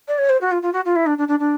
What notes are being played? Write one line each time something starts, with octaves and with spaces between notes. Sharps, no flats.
D5
C#5
C5
F#4
F4
F4
F#4
F4
E4
D4
D4
D4
D4